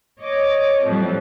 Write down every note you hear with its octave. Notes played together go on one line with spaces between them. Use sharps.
C#5 D#5 D6
F2 A2 F#3 G3